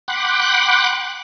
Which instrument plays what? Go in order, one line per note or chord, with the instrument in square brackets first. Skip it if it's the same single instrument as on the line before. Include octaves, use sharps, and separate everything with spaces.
[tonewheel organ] F#5 G5 B5 C6 D6 F#6